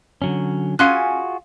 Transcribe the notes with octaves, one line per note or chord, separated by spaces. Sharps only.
D3 F#3 C#4
C#4 F4 F#4 G#4 F5 G#5 C6 F#6